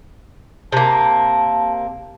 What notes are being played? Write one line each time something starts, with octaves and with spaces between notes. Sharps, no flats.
C3 A#3 A5